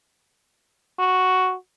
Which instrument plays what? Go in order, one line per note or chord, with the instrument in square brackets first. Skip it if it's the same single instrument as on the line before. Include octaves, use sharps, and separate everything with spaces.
[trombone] F#4